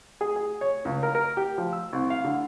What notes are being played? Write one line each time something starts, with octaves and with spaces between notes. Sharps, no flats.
G#4
G#4
C#5
C#2
A#4
A#4
G4
F3
E6
C2
F5
D3